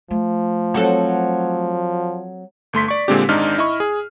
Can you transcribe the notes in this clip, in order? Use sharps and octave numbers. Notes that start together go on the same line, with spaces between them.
F3 A3
F#3 C4 A4
G1 A3 C6 B6
D5 C#6
A#2 D3 G#3 C4 D4 G4
G#1 G#2 D4 D#4 D5 F6
E4 D#5 B5 C#6
G#4